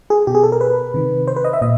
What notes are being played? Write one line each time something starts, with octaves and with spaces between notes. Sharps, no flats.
G#4
B2 G4
G#4
A4
A#4
B4
C3 D#3
C5
B4
D#5
E5
A#2 D#5